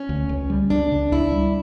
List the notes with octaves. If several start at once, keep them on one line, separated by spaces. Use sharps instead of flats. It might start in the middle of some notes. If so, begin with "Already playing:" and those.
Already playing: C#4
D2
C#2
G3
C#2 D4
C#3
C#2 E4
G3